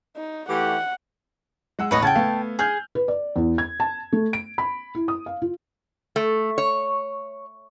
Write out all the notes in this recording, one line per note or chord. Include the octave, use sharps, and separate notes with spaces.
D#4
E3 A3 G4 F#5
G#3 F#5 E6
A1 E2 A2 B4 C#5 D#5
C#3 F#5 G5 A5 G#6
A3 B3 F5
G#4 G#5 F6 G6
B4
D5
E2
G#6
A5
A3
D7
B5
E4
D#6
F5
F4
A3
C#5